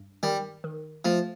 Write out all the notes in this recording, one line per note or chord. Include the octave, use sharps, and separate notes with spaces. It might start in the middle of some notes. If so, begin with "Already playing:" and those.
Already playing: G2
D#3 G3
D#3
F3 A3